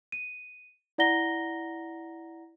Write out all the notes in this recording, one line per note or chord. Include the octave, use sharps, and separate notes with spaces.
D#7
E4 D5 F#5 A#5 A#6 G7